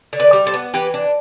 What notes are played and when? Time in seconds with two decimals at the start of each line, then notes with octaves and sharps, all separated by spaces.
0.13 D3
0.20 B4 D5
0.33 G3
0.47 A4 C5
0.54 B3
0.74 E3 G4 B4
0.94 D4